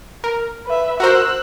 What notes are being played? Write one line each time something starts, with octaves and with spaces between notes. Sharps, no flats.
A#4
B4 E5
F#4 A#4 C5 E6 F#6